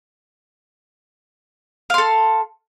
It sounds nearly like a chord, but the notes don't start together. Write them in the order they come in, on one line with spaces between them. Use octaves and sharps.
F5 C6 A4